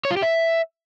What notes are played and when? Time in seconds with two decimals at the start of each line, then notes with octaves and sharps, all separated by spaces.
0.05 C#5
0.11 F4
0.17 G4
0.22 E5